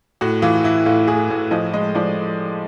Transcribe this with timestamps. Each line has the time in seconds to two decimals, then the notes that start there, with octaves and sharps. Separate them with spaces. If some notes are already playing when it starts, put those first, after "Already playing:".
0.21 A2 F#4
0.42 E3 F4
0.64 E3 E4
0.86 A2 F4
1.07 A2 G#4
1.30 A2
1.51 F3 D#5
1.73 G#3 D#5
1.95 F3 D5